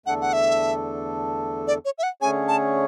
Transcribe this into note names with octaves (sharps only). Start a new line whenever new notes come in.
E2 D3 A3 D4 A4 F#5
F#5
E5
D5
C#5
E5
F#5
D3 A3 C#4 G#4 C#5 G#5
A5